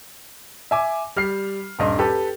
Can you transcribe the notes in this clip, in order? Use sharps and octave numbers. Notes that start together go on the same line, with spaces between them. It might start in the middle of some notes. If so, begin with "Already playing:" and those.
E5 G#5 D6
G3 F6 C7
D#1 G2 D#5 C6
G4 A4 B4